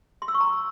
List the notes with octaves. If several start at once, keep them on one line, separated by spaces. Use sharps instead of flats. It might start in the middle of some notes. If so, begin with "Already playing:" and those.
C6
E6
C#6
A#5